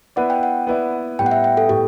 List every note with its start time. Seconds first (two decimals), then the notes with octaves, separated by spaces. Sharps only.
0.16 B3 E4 B4 D5 F#5
0.30 G5
0.43 F#5
0.67 B3 E4 B4 D5
1.19 A2 G3 B3 G5
1.26 F#5
1.31 E5
1.44 G5
1.57 A4
1.69 A2 G3 B3 G4